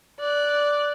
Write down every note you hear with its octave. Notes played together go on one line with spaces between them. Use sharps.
D5 F#6